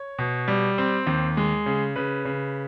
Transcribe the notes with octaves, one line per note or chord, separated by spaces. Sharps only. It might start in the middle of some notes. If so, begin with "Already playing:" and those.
Already playing: C#5
B2
G3
C4
D#2
G#3
C#3
C#3 B4
C#3